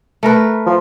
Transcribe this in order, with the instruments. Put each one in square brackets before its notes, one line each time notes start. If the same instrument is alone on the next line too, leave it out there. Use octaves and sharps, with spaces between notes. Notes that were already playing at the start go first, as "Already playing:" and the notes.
[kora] A3 A#4 B4
[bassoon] F3